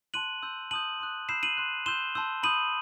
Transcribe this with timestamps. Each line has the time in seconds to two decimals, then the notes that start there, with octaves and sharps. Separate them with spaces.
0.14 A5 C6 F#6 D#7 F#7
0.43 C6 E6 G6
0.71 A5 D#6 G6 D#7 F#7
1.00 C6 D#6 F#6
1.29 B5 E6 G6 C7 E7
1.43 D#7 F#7
1.57 C6 F#6
1.86 C6 E6 G6 E7 G7
2.15 A5 C6 E6 G6
2.43 B5 D#6 G6 D#7 F#7